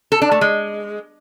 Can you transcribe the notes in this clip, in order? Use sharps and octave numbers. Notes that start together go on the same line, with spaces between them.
A4
D4
A3
G#3